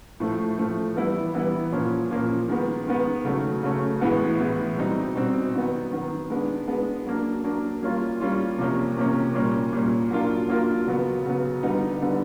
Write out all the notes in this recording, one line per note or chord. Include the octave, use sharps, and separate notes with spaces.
A2 F3 A3
A2 F3 A3
E3 G3 B3 E4
E3 G3 B3 E4
A#2 F3 A#3 C#4
A#2 F3 A#3 C#4
D#3 G#3 B3
D#3 G#3 B3
C#3 F#3 A3 C#4
C#3 F#3 A3 C#4
A2 E3 G#3 B3
A2 E3 G#3 B3
B2 G3 C4 D#4
B2 G3 C4 D#4
D#3 F#3 B3
D#3 F#3 B3
G#3 B3 D4
G#3 B3 D4
F#3 A#3 D4
F#3 A#3 D4
G3 A#3 C#4 F4
G3 A#3 C#4 F4
C3 F3 A#3 C#4
C3 F3 A#3 C#4
A#2 G3 A#3 C#4
A#2 G3 A#3 C#4
F#3 A#3 D4 F4 A#4
F#3 A#3 D4 F4 A#4
C#3 F#3 B3
C#3 F#3 B3
D3 G3 B3 D#4
D3 G3 B3 D#4